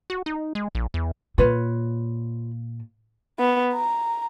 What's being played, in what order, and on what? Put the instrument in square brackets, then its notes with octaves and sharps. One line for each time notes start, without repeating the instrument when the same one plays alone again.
[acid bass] F#4
D#4
G#3
A#1
E2
[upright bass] A#2 [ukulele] F4 B4 C#5
[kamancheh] B3
A#5